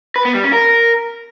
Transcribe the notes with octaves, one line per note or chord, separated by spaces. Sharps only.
B4
B3
G3
C#4
A#4